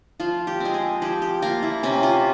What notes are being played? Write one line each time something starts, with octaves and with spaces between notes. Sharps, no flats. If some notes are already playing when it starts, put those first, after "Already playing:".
F3 F4
G4
G#3 C4
G#4
F3 G4
G4
A#3 F4
E4
C3 C#4
F4